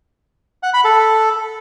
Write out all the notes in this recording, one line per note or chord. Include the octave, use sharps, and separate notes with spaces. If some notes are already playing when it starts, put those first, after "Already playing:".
F#5
B5
A4